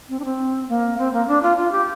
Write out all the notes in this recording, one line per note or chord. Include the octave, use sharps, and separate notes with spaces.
C4
D4
C4
A#3
C4
A#3
D4
F4
F4
G4